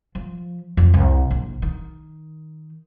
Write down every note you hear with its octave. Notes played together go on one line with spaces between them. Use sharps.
F3
F2
C2
A#1
D#3